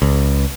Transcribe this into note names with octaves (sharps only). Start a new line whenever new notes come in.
C#2